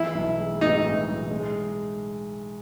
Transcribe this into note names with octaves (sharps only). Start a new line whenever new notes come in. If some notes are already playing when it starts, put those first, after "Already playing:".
Already playing: E3 E4
B1
G#3
A2 D#4
E3
B1
G#3